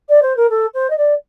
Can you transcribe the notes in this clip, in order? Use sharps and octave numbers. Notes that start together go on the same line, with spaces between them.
D5
C5
A#4
A4
C5
D#5
D5